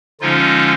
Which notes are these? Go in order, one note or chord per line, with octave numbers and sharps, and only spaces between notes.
D3 F3 G#3 C#4 D#4 F4